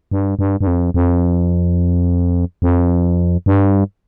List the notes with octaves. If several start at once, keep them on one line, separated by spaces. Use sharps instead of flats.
G2
G2
G2
F2
F2
F2
G2